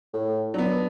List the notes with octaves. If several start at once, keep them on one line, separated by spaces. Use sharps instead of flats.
A2
F#3 B3 D4